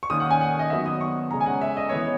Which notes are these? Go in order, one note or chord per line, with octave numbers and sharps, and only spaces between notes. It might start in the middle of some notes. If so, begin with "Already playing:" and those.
C#6
D#3 A#3 C#4 D#6
F#5
G#5
F#5
D#5
D#3 F#3 B3 E5
D#6
C#6
C#3 G#3 C#4 A#5
G#5
F#5
E5
D#5
E3 B3 C#5